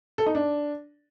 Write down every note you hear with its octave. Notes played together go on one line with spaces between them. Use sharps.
A4
D#4
D4